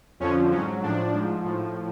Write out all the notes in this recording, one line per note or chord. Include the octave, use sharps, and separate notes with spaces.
F2 D3 F3 C#4
G#2 F#3 C#4
A2 F3 D4
G#2 F3
A2 F3